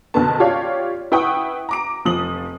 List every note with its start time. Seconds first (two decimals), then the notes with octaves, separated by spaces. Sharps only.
0.14 F#1 B2 D3 B3 A5
0.40 F4 G4 C#5 D5 F5
1.12 E4 B4 F#5 G5 C#6 D#6
1.69 A#5 D6 D7
2.05 F1 F3 D#6 F#7